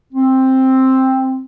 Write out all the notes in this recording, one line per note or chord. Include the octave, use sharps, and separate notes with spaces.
C4